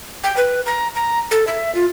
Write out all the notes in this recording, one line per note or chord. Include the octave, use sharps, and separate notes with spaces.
G5
B4
A#5
A#5
A4
E5
F4